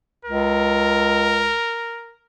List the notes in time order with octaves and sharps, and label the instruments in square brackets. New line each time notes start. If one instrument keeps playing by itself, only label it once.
[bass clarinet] C#2 [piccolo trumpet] A#4